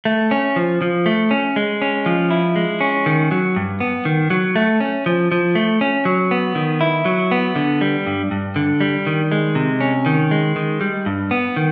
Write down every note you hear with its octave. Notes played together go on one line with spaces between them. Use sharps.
A3
C#4
F3
F3
A3
C#4
G#3
C#4
F3
E4
G#3
C#4
D#3
F#3
G2
B3
D#3
F#3
A3
C#4
F3
F3
A3
C#4
F#3
B3
D#3
E4
F#3
B3
D3
G3
G2
G2
D3
G3
D#3
G#3
C3
C#4
D#3
G#3
D#3
G3
G2
B3
D#3